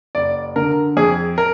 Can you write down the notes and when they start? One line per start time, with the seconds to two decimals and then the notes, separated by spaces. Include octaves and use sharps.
0.15 F#1 D5
0.56 D3 A#4
0.97 F2 G#4
1.38 A#4